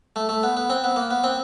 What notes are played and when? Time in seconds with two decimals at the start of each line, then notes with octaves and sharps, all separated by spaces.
0.16 A3
0.29 A3
0.43 B3
0.57 B3
0.70 C4
0.84 B3
0.96 A#3
1.11 B3
1.24 C4